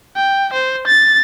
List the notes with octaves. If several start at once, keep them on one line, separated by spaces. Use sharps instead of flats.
G5
C5
A6